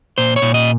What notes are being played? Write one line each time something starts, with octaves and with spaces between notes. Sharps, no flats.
A#2 C5
C#5
A#2
D#5